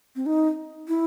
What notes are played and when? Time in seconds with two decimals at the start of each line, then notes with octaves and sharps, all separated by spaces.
0.16 C4
0.26 D#4
0.88 E4